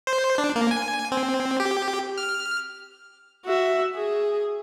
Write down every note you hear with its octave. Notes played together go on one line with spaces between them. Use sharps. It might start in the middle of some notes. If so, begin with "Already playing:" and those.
C5
D4
A#3
G#5
C4
G4
F6
F#4 E5
G#4